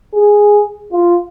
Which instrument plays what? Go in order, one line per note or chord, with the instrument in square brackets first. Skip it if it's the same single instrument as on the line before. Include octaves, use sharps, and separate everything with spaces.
[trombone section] G#4
F4